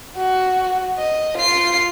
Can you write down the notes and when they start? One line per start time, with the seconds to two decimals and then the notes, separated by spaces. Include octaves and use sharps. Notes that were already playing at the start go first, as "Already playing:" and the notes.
0.17 F#4
0.98 D#5
1.38 F4 C7